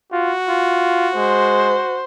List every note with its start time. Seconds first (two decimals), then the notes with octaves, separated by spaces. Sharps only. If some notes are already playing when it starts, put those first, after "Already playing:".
0.12 F4 F#4
0.48 F4
1.16 G#3 C5